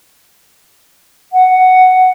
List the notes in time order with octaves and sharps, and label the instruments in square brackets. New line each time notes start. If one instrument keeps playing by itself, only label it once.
[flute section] F#5